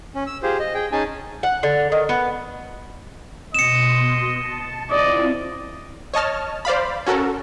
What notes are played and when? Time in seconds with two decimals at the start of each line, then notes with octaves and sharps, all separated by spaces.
0.15 C#4
0.27 E6
0.43 F4 G4 G#4 C5
0.60 D#5
0.74 G#4 G5
0.92 C#4 D#4 G#4 G#5 A5
1.43 F#5
1.63 D3
1.92 D#3
2.09 B3
3.54 B2 D#5 C6 C#7 E7
4.33 A5
4.91 C4 E4 F4 D5 D#5
6.14 C#5 D#5 A5 F6
6.65 C5 D5 F5 B5
7.07 C#4 F#4 A4 A#4